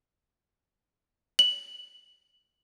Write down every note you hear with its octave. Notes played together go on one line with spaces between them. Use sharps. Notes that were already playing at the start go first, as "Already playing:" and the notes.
F#7